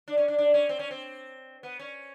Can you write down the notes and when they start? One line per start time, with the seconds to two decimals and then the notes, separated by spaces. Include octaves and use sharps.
0.08 D4
0.17 C#4
0.28 D4
0.38 D4
0.54 C#4
0.69 C4
0.79 C#4
0.91 C4
1.63 B3
1.79 C#4